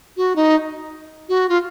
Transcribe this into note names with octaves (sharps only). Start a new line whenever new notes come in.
F#4
D#4
F#4
F4